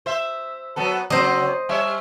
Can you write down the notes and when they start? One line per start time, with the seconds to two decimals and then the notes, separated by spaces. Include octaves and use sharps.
0.06 C5 E5
0.76 F#3 B3 A4
1.10 C#3 F#3 C4 C5 D#5
1.69 G3 C#5 E5